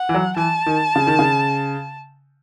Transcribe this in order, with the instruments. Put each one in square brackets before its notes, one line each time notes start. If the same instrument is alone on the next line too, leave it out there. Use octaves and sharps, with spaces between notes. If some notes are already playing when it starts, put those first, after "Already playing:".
Already playing: [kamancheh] F#5
[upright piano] E3
F#3
[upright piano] E3 [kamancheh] A5
[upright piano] D#3
C#3
D#3
C#3